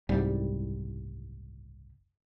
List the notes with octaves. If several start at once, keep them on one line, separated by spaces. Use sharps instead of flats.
F#1 C2 G#2 G3